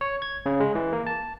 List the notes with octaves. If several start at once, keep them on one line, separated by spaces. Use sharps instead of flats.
C#5
G#6
C#3
G#3
E3
A#3
A5